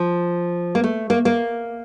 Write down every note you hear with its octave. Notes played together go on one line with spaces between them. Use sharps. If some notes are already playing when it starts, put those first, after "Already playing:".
Already playing: F3
A#3
A3
A#3
A#3